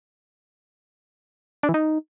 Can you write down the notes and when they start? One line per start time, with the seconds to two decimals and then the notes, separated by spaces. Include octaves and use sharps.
1.63 D4
1.69 E3
1.74 D#4